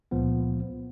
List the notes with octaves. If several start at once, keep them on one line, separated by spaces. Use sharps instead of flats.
C#2 A#2 F3 B3